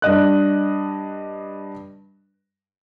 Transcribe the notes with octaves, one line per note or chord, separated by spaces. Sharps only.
G2 D4 D#5 F#6